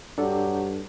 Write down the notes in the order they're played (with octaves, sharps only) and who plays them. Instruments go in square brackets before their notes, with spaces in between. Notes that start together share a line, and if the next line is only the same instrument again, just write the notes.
[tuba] G2 [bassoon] F#3 [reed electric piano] D4 A4 [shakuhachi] G4